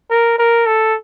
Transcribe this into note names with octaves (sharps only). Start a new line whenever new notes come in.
A#4
A#4
A4